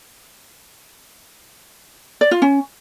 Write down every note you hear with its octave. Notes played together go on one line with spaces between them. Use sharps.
D5
F4
C#4